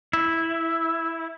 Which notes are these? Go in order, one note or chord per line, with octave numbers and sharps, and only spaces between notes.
E4